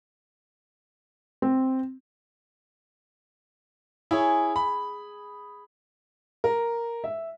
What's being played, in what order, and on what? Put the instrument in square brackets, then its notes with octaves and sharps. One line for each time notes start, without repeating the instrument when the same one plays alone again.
[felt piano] C4
[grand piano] E4 C#5 [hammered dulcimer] G#4
[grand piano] B5
[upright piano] A#4
E5